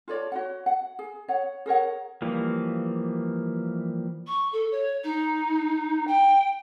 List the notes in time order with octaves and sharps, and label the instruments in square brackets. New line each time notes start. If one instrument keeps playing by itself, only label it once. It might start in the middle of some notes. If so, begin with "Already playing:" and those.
[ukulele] F4 A4 C#5 D5
F#4 C#5 F#5
F#5
G#4
C#5 F#5
G#4 A#4 C#5 F#5
[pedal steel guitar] E3 F3 G3 A#3
[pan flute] C#6
A4
C#5
D#4
G5